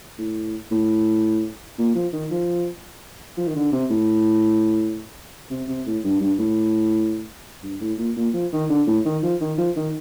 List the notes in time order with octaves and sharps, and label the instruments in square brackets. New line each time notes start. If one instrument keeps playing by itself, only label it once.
[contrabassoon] A2
A2
A#2
F3
D#3
F3
F3
D#3
D3
C3
A2
C3
C3
A2
G2
G2
A2
G2
A2
A#2
A#2
F3
D#3
D3
A2
D#3
F3
D#3
F3
D#3